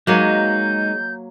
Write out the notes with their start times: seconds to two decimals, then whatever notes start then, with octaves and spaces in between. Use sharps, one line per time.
0.07 F#3 G#3 A#3 D#4 G6